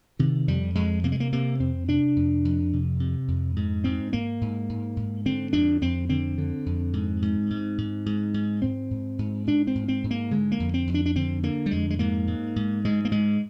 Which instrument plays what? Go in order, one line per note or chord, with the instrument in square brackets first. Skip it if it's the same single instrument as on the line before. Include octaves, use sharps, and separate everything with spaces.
[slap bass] C3 D#3
F2 G3
F2 G#3
C3 A#3
G#3
A#3
C3 A#3
F2 C4
C3 D4
F2
F2
C3
C3
F2
G#2
G#2 C4
G#2 A#3
G#2
G#2
G#2
D3 C4
F2 D4
F2 C4
D3 C4
D3
F2
G#2
G#2
G#2
G#2
G#2
G#2
G#2 C4
G#2
G#2
G#2 D4
C4
G#2
C4
G#2
A#3
D3 G#3
A#3
F2
C4
F2
D4
D4
D3 C4
D3 A#3
G3
F2 G#3
G#3
G#2 A#3
G#2
G#2
G#2 G#3
A#3
G#2 G#3